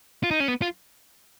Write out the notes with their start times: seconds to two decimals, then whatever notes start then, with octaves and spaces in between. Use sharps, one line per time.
0.23 F4
0.31 D#4
0.40 C#4
0.48 B3
0.62 F4